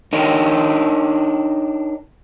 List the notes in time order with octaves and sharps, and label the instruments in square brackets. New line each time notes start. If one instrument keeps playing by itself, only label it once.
[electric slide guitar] D4 D#4 A#4 C#5 D#5 G5